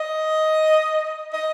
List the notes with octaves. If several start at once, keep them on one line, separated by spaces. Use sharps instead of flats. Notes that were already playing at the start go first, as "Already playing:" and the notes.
Already playing: D#5
D#5